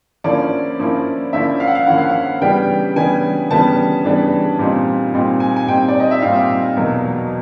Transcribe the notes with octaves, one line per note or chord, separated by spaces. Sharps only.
D3 F3 A#3 C#4 E4 D5
D3 F3 A#3 C#4 E4
D3 F3 A#3 C#4 E4 E5
F5
F#5
F5
D3 F3 A#3 C#4 E4 F#5
F5
F#5
C#3 E3 G3 B3 D4 G5
C#3 E3 G3 B3 D4 G#5
C#3 E3 G3 B3 D4 A5
C#3 E3 G3 B3 D4
A#2 G3 C4 D#4
A#2 G3 C4 D#4
G#5
G#5
A#2 G3 C4 D#4 G5
D5
D#5
E5
A#2 G3 C4 D#4 F5
E2 B2 F#3 A#3